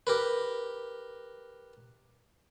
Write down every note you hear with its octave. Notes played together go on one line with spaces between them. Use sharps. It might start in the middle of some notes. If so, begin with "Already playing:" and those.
G4 A#4 B4